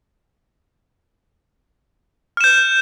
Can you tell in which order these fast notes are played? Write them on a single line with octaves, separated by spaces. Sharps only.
F6 E7 G6